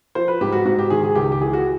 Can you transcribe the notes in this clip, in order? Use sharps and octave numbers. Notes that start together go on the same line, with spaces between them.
F3 C5
B4
G#2 G4
F#4
G#2 F#4
G4
D#3 G#4
G#4
C#2 G4
G4
E3 G#4
F#4